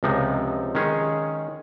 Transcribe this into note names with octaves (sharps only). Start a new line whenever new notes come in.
C#2 C3 F3 G#3 D#4
D#3 G#3 C#4 G#4 C#5